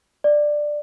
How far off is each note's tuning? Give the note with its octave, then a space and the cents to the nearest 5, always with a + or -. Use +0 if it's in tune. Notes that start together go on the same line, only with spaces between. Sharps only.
D5 +10